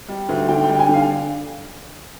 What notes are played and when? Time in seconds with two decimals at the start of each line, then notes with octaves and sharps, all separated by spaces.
0.09 G3
0.29 D2
0.48 D3 G5
0.64 G5
0.69 G3
0.79 G#5
0.89 D3 F5